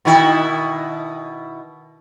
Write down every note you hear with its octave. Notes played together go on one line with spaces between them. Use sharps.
B2 D#3 E4